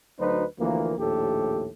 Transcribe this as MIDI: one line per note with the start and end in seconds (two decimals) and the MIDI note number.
0.19 0.45 38
0.19 0.45 54
0.19 0.45 63
0.19 0.45 71
0.19 0.45 72
0.59 0.97 38
0.59 0.97 52
0.59 0.97 53
0.59 0.97 58
0.97 1.69 34
0.97 1.69 39
0.97 1.69 45
0.97 1.69 67
0.97 1.69 69